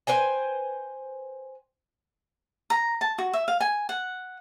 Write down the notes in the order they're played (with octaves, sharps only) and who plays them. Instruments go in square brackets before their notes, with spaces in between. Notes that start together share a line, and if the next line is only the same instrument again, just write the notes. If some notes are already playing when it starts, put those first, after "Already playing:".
[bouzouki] B4 C5 G5 G#5
[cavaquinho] A#5
A5
F#4
E5
F5
G#5
F#5